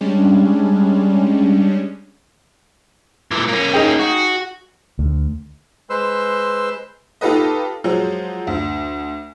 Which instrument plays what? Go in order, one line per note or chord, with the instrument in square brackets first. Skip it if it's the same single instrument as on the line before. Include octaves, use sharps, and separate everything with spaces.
[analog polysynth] G3 G#3 C#4 D4
[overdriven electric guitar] A#2 E3
A#3 C#4
[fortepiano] D#4 G#4 G5
[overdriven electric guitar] F#4
[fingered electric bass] D2
[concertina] G#3 B4 C5 C6 E6
[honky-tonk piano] D#4 F4 G4 A4 B4 D#5
F3 F#3 G#3
D2